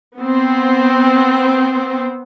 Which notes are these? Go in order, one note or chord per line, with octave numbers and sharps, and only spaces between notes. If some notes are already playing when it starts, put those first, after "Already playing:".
B3 C4